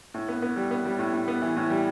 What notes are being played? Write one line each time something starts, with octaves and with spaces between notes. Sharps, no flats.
A2
B3
B3
G3
B3
G3
A2
A2
B3
E3
A2
G3